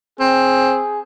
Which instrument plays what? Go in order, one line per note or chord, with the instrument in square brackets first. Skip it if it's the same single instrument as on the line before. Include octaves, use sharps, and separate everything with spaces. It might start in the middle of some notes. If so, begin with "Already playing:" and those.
[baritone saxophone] C4 [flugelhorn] G#4